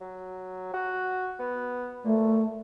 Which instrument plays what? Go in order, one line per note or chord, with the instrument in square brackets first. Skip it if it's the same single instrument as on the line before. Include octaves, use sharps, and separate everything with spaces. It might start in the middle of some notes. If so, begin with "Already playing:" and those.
[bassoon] F#3
F#4
B3
[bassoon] A#2 [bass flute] A3